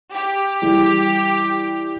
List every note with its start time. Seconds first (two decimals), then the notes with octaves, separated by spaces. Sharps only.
0.14 G4
0.62 E3 G3 E4